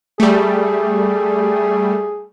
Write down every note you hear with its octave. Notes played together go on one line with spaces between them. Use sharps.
G3 A3 G#4